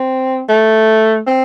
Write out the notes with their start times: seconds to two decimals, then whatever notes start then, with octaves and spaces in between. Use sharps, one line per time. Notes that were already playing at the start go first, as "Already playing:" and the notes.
Already playing: C4
0.49 A3
1.27 C4